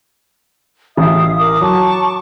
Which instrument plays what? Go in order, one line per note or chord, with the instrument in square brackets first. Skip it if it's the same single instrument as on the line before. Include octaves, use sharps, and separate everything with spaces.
[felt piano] A1 [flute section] E5 F5 D#6
[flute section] A#4 D6 D#6
[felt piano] F#3 [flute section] A5 C#6 D6